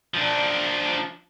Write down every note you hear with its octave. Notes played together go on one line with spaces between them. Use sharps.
F3 D4